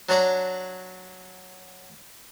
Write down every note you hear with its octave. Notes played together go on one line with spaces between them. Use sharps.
F#3 D4 C#5 D5 A#5